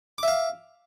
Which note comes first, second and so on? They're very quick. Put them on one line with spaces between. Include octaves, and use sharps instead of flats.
D6 E5 F5